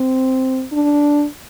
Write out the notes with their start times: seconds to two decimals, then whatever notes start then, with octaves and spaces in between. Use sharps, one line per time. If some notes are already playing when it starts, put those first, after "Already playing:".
Already playing: C4
0.72 D4